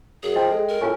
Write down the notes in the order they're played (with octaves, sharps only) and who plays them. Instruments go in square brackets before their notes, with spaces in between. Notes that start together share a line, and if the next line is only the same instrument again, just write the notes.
[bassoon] F#2 [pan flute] G#4
[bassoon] F3 [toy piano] D#5 G5
[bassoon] G#3 [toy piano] A4
[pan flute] A#4
[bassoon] A2 [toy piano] F4 G#5 C#6